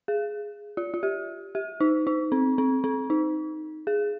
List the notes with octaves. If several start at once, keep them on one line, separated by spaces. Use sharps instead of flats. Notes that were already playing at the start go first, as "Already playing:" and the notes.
G#4
F4
F4
G4
G4
D#4
D#4
C4
C4
C4
D#4
G#4